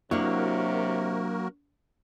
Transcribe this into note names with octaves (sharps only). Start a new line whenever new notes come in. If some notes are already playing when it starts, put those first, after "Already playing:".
C3 F#3 A#3 D4 E4 F#4 A#4 C#5